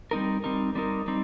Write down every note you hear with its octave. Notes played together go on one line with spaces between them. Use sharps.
G3 C4 D#4 A#4
G3 C4 D#4 A#4
G3 C4 D#4 A#4
G3 C4 D#4